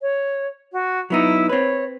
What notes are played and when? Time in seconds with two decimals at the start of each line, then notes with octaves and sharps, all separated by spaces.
0.01 C#5
0.72 F#4
1.10 F#3 B3 D#4 E4
1.49 C4 B4 C#5